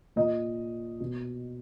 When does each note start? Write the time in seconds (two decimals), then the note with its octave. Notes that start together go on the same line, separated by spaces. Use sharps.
0.16 A#2 D#5
1.00 B2